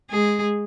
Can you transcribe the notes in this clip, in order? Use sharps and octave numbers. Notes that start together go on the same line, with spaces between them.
G#3 G#4